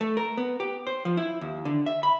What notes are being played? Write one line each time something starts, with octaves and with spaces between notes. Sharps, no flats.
A3
A#4
B3
G4
C5
F3
E4
D#2
D3
E5
B5